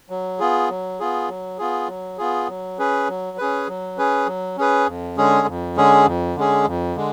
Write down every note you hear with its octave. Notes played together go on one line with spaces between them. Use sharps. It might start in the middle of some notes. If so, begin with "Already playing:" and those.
F#3
B3 F4 G#4
F#3
B3 F4 G#4
F#3
B3 F4 G#4
F#3
B3 F4 G#4
F#3
C#4 G#4 B4
F#3
C#4 G#4 B4
F#3
C#4 G#4 B4
F#3
C#4 G#4 B4
F2
D3 G#3 C#4 G#4
F2
D3 G#3 C#4 G#4
F2
D3 G#3 C#4 G#4
F2
D3 G#3